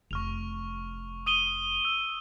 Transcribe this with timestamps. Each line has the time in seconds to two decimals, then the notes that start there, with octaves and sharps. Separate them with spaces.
0.11 F1 C#6 F6 F7
1.26 D#6 D#7 G7
1.85 E6